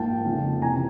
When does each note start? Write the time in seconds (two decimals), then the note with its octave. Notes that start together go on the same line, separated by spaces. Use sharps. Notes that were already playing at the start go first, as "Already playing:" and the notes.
Already playing: G#2 F3 A#3 G5 A5
0.25 F2 C#3 F3
0.62 C3 E3 G#5 A#5